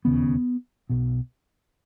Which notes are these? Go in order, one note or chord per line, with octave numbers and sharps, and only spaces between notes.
E1 D#2 C#3 B3
B1 B2